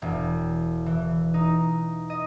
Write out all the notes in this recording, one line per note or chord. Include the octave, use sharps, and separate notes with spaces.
E1
E3
D#4
D#5